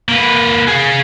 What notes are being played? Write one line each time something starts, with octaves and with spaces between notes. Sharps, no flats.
A#3 B4
G#4 F5